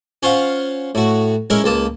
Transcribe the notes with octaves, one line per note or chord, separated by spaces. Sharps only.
C#4 F4 C5 F5 F#5
A2 F#4
G#3 C#4 E4 A#4
C#2 A#3 A5 D#6